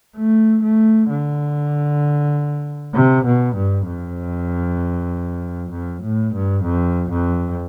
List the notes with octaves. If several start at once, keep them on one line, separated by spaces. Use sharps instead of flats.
A3
A3
D3
C3
B2
G2
F2
F2
A2
G2
F2
F2